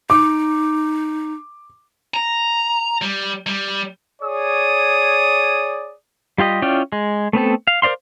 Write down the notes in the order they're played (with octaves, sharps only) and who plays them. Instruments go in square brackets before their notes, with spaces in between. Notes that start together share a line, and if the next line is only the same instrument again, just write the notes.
[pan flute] D#4 [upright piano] D6
[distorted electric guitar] A#5
G3
G3
[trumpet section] G#4 C#5 D5 D#6
[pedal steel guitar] G3 F4 G4 D#5
C#4 E4 F4 D5 G5
G#3
A3 B3 C4 A4
F5
A#4 C5 D5 F5 C6